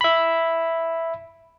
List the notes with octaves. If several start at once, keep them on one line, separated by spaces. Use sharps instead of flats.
E5 B5